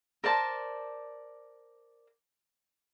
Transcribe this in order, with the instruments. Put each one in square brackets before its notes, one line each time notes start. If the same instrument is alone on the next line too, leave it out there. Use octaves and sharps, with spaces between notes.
[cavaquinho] A#4 C5 D5 A5